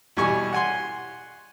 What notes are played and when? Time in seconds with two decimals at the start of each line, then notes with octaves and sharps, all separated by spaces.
0.17 E2 B2 G3 G#5 C#6
0.53 F#5 G#5 C6